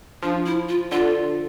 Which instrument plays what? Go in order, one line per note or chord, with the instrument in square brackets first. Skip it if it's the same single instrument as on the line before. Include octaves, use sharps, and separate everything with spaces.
[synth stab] F3 [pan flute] D4
[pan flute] E4
F4
[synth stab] D3 [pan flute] F4